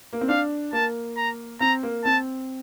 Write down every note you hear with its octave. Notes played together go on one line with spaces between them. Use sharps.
A#3
C4
D4 F5
A#3 A5
A#5
C4 A#5
A#3
C4 A5